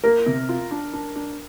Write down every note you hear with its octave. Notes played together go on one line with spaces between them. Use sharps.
A#3 A#4
C3
F4
D4
D4
D4